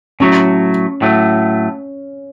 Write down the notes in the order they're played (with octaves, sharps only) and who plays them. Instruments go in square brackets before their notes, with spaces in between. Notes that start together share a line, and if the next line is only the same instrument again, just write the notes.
[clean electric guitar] A2 F#3 A3 [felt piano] C#4
[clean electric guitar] A2 F#3 A3